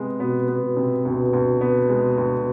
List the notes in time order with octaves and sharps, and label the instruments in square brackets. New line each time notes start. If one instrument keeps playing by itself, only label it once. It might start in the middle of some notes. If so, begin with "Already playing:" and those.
Already playing: [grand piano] C3 G#3 B3
[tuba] B2 [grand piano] B3
[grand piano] B3
[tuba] B2
[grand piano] C3
[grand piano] D2 [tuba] B2
[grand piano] D2
B3
G#3
D2